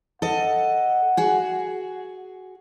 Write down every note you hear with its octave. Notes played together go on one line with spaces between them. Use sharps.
A4 D#5 F#5
F#4 G#4